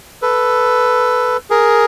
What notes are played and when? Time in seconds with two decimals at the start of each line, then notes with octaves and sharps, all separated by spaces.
0.22 A4 B4
1.50 G#4 A#4